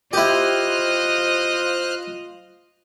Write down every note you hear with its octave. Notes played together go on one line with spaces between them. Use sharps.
E4 F4 G4 C5 D#5 F6 F#6